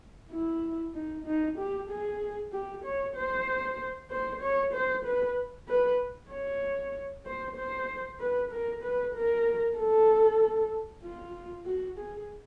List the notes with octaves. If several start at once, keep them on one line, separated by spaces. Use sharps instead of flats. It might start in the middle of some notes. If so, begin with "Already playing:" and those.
E4
D#4
D#4
G4
G#4
G4
C#5
C5
C5
C#5
C5
B4
B4
C#5
C5
C5
B4
A#4
B4
A#4
A4
F4
F#4
G#4